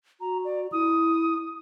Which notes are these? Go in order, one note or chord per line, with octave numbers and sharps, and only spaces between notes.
F#4 A#5
D5
E4 D#6